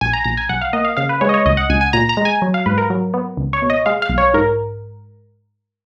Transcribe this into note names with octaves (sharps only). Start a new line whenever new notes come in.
A#1 G#5
A#5
A#1 A#5
G#5
B1 F#5
F5
A#3 D#5
F5
C#3 F5
B4
G#3 C#5
D#5
C#5
C#2 D#5
F#5
C#2 G#5
G#5
A#2 A#5
A#5
G#3
G#5
F#3
F5
G#2 B4
A#4
F#3
B3
C#2
C#5
B2
D#5
G#3 F5
F5
B1
C#5
G#2 A#4